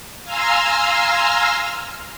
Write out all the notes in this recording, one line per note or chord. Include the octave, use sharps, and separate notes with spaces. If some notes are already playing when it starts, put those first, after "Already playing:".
F5 G#5 A#5 C6 E6 F6